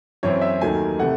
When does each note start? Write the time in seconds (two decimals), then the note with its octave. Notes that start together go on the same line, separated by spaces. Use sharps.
0.23 F#2 E3 C4 C#5
0.41 E5
0.61 D#2 D#3 F#3 A3 G#5
0.99 C3 E3 A3 F#5